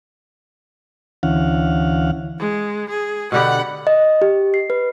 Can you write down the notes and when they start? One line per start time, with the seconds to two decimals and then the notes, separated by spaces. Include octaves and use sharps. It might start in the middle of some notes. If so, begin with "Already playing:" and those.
1.23 D2 E3 C#4 F5 F#5
2.39 G#3
2.89 G#4
3.32 B2 D3 G4 F#5 B5
3.87 D#5
4.22 G4
4.54 C7
4.70 B4